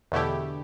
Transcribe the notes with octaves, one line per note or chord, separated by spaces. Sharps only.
E2 B2 D3 A3 E4 G4